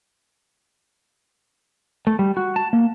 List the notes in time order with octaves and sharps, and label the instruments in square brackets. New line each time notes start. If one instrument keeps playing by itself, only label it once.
[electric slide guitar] A3
G3
F#4
A5
A#3